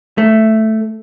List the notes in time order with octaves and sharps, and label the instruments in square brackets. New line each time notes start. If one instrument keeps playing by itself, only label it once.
[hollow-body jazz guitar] A3